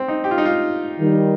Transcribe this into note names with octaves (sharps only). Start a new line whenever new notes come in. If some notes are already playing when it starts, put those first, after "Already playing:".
Already playing: C4
D#4
G4
F4
D#4
F4
D#3 G3 D#4